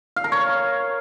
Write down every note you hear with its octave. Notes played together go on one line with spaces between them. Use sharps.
F5
A#4
C#5